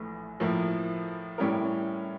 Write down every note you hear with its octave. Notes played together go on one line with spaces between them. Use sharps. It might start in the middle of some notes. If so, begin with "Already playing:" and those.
Already playing: A#1 A2 E3 A3
A2 F3 A#3 E4
A2 G3 C#4 E4 A#4